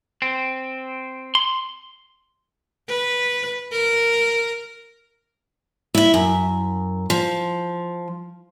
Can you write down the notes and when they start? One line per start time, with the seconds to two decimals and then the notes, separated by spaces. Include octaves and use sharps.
0.22 C4
1.35 C6
2.88 B4
3.72 A#4
5.95 E4 E5
6.14 F#2
7.10 F3